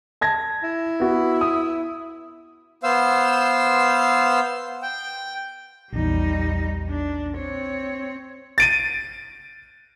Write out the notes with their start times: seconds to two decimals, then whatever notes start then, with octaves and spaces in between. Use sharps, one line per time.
0.21 A5 G#6 A#6
0.63 E4
1.00 B3 F#4
1.41 D#6
2.83 B3 C5 F5 E6
4.83 G5
5.93 A#1 E2 G3 D#4
6.90 D4
7.36 C4 C#5
8.58 A6 D7 D#7